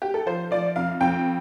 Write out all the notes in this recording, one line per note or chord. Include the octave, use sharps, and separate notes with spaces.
G4
A4
F3 C5
F3 D5
F2 F5
F2 G5